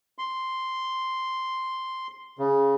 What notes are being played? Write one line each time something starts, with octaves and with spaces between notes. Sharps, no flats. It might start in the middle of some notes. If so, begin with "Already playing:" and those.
C6
C#3